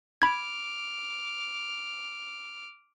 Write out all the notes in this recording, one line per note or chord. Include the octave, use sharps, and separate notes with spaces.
B5 D6 F6 G#6